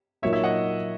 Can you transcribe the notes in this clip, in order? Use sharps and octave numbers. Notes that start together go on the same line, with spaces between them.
A#2 F#3 A#3 D#4 C#5 E5
C#5 E5
D#5 F#5